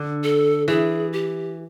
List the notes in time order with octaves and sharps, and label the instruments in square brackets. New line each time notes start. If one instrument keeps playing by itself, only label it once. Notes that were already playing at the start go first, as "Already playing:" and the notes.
Already playing: [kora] D3
[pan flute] A4
[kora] E3 [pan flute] G#4
[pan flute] G4